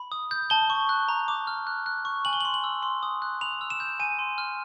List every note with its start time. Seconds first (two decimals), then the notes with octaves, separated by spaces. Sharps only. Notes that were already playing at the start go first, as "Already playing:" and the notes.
Already playing: B5
0.12 D#6
0.31 G6
0.50 A5 G7
0.70 C#6
0.89 F#6
1.08 A#5
1.28 D6
1.47 F6
1.67 F#6
1.86 F#6
2.05 C#6
2.25 G#5 F#7
2.33 G7
2.41 F#7
2.45 C6
2.54 F#7
2.64 E6
2.83 C6
3.03 D#6
3.22 F#6
3.41 B5 F7
3.61 E6
3.70 E7
3.80 G6
4.00 G#5 D#7
4.19 C6
4.38 F6